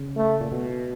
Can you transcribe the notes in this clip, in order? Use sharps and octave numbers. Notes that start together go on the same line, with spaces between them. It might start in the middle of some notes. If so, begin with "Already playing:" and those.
Already playing: C#3
A3
A#2
B2